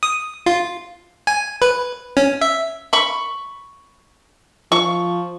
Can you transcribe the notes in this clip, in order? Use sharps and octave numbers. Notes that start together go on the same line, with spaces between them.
D#6
F4
G#5
B4
C#4
E5
B5 C#6
F3 C#6